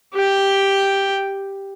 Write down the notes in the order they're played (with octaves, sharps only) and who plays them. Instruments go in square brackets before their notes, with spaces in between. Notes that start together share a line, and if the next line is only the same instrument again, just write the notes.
[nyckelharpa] G4 G5